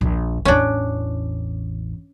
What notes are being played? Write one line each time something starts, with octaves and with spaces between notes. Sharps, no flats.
A#1 D#2
A1 E2 C#4 D4